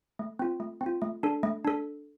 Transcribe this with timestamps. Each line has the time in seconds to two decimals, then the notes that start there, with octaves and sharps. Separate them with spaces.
0.19 A3
0.39 C4 F4
0.60 A3
0.81 C4
0.86 F4
1.02 A3
1.23 D4 A4
1.43 A3
1.65 D4 A4